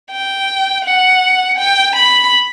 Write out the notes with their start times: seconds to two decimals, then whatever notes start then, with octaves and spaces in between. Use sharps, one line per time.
0.12 G5
0.85 F#5
1.59 G5
1.96 B5